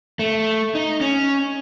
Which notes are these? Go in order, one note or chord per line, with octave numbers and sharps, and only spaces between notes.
A3
D#4
C#4